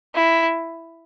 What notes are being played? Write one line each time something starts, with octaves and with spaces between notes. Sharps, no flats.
E4